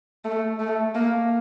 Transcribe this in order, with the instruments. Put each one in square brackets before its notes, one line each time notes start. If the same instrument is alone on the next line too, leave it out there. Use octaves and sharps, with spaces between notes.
[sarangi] A3
A3
A#3